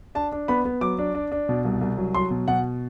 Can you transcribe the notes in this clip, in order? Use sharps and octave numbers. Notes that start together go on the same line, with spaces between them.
D4 A5
D4
B3 B5
B3
F#3 D6
D4
D4
D4
B2
C2
C2
F#3
F#3 C6
B2
B2 F#5